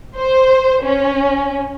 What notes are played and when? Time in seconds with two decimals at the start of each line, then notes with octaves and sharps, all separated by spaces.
0.15 C5
0.83 C#4